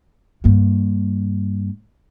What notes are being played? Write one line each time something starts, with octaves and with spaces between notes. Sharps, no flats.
G2 A#3